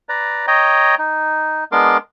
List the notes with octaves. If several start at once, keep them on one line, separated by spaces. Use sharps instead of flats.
B4 D5 A#5
C#5 D#5 G5 A#5
D#4
G#3 B3 D4 A#4 C6 D6